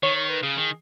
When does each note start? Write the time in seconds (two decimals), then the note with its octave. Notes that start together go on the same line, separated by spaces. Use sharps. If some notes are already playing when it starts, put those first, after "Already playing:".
0.03 D#3 C#5
0.16 C#5
0.29 B4
0.43 C#3 G#4
0.57 D#3